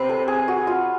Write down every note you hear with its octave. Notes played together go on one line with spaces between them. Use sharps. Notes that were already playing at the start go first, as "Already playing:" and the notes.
Already playing: C3 C4 B4 C#5
A4
G#4
F#4
F4